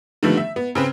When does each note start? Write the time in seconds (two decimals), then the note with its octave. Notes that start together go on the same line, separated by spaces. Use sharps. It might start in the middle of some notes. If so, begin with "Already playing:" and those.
0.23 D3 D#3 F3 G3 A3 B3
0.37 E5
0.56 B3
0.75 C#3 C4 B4